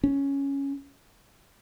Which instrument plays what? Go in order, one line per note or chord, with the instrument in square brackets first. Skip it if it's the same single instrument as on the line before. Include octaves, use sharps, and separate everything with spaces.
[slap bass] C#4